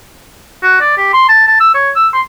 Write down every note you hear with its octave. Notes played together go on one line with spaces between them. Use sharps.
F#4
D5
G4
C6
A5
A5
E6
C#5
E6
C6